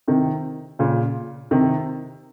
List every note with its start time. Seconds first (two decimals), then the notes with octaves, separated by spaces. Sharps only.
0.08 C3 D#3
0.79 A#2 C#3
1.51 C3 D#3